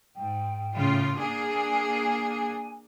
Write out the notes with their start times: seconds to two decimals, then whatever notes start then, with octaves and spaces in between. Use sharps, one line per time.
0.16 G#2 G5
0.75 A2 C#3 F4
1.19 A#3 D4 G#4 G#5